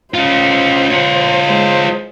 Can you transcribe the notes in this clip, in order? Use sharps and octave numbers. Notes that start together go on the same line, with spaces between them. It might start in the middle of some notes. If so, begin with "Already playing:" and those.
C#4 F4 C5
F4 C#5
G#3 C5